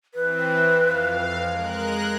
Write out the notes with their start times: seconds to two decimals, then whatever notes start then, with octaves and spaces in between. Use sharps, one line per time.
0.14 E3 C4 B4
0.81 F2 F5
1.49 G#3 A#4 F#6